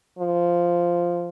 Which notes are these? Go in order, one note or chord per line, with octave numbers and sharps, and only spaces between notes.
F3